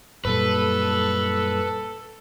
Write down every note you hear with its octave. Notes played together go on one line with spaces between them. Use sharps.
F#2 A#2 G3 A4 B4